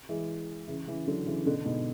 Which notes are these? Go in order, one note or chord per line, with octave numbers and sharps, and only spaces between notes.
E3 G#3
C#3 E3
C#3 E3
D3 F#3
C#3 E3
B2 D3
G#2 B2